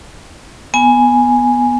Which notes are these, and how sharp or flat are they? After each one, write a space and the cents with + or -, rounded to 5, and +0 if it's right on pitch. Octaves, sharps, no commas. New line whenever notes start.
B3 +0 G#5 +0